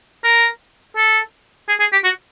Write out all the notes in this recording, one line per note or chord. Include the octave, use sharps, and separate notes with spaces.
A#4
A4
G#4
G#4
G4
F#4